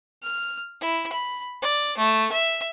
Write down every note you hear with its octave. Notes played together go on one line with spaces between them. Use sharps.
F6
E4
B5
D5
A3
E5